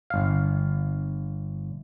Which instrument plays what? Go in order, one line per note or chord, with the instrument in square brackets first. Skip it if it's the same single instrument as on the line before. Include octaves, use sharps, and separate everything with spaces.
[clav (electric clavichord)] G1 F5